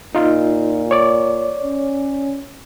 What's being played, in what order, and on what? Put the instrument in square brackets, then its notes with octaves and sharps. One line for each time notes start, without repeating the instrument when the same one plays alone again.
[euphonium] A#2 [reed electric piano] D#4 F4
[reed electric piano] C#5 D5
[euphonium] C#4